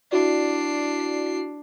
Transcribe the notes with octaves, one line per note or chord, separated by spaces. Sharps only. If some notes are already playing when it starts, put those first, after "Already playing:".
D4 E4 F#4 D5 C7